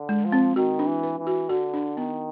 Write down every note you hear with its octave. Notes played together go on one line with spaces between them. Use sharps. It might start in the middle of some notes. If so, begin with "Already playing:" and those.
Already playing: D3
G#3
F3
C4
D#3 F#4
D4
E3
B4
E3
F#4
D3 F#4
D4
D#3 B3